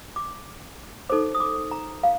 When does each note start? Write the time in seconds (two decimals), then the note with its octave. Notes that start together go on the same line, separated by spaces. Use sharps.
0.16 D6
1.10 D#4 A4 C5 D6
1.35 D#6
1.40 D6
1.71 A#5
2.03 F5